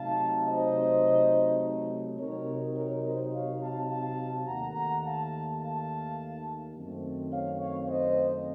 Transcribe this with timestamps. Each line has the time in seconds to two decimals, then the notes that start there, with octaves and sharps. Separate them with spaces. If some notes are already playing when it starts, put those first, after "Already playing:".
Already playing: C3 F#3 A3 D#4 F5 A5
0.47 C5 D#5
2.18 C3 F#3 C4 D#4 A#4 C#5
2.75 A#4 C#5
3.03 C5 D#5
3.32 C#5 F5
3.60 F5 A5
3.89 F5 A5
4.46 D#2 D#3 A3 F#5 A#5
4.75 F#5 A#5
5.03 F5 A5
5.61 F5 A5
6.75 F#2 D#3 A3 C4
7.31 C#5 F5
7.60 C#5 F5
7.88 C5 D#5